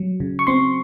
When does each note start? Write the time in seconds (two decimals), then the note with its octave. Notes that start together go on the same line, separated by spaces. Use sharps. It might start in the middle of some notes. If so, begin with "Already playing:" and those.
Already playing: F#3
0.20 C#3
0.39 C#6
0.47 C4 C6